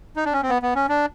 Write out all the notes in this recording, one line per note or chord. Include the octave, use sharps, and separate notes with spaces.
D#4
D4
C#4
C4
B3
B3
C#4
D4